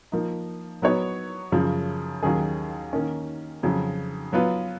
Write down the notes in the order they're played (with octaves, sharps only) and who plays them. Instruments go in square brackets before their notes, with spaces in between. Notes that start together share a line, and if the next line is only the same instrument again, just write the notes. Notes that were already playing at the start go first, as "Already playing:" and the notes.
[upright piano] F3 A#3 D#4
F#3 B3 D#4 F#4 C#5
F#2 C#3 F3
D#2 D#3 F#3 C#4 G#4
D#3 A#3 C#4
F2 C#3 F#3
F#3 B3 F4 B4